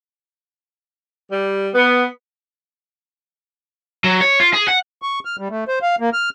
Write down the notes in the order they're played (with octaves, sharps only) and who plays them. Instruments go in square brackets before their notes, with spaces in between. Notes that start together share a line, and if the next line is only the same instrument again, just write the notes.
[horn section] G3
B3
[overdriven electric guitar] F#3
C#5
F4
G#4
F#5
[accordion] C#6
F6
G3
A3
C5
F5
A#3
F6